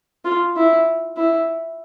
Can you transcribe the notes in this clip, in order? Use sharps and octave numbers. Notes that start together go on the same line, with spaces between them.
F4
E4
E4